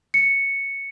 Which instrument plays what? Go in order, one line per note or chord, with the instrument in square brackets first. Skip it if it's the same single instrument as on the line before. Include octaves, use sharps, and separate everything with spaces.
[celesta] C#7